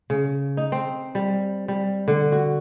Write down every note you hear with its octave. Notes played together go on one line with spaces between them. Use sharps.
C#3
D#4
C4
G3
G3
D3
F#4